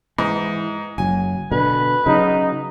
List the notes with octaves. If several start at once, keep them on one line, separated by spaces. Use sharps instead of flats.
G#2 E3
F#1 F#3 G#5
B2 D3 B4
C#3 F#3 D#4